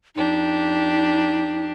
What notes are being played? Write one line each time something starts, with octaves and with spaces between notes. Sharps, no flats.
F2 D4 D#4 G4